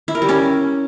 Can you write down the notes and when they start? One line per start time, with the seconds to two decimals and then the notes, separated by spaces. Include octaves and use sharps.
0.08 E4
0.15 A#4
0.22 G3
0.29 C#4